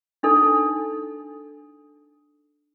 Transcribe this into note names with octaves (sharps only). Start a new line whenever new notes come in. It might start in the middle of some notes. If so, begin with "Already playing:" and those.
D4 D#4 A4